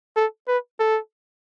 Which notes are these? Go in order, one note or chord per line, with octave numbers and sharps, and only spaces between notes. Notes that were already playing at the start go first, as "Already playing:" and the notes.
A4
B4
A4